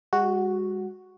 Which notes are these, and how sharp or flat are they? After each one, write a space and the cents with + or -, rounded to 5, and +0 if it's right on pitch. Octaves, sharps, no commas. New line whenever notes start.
G#3 -40 F#4 +0